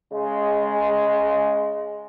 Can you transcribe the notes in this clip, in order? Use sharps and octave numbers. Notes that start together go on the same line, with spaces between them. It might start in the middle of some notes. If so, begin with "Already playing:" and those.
C#3 G#3